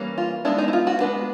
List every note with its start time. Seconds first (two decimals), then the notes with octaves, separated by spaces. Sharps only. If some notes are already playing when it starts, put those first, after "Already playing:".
Already playing: E3 G3 A#3 C#4
0.18 F4
0.45 G#3 B3 D4 E4
0.58 D#4
0.68 E4
0.73 F4
0.87 F#4
1.00 G#3 B3 D4 B4